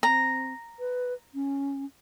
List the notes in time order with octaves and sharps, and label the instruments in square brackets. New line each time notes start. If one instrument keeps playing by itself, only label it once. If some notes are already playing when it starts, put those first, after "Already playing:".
[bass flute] C4 [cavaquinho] A#5
[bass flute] B4
C#4